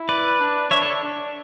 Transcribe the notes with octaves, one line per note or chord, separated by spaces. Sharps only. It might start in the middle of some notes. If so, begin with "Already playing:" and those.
Already playing: E4
B4 D5
D4
D4 C#5 E5
A4 C#5
D4